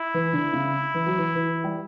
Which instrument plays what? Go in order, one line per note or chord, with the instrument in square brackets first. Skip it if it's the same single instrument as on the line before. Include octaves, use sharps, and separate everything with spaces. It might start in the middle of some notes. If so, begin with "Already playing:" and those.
Already playing: [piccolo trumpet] E4
[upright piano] E3
D3
C#3
E3
F#3
E3
E3
G3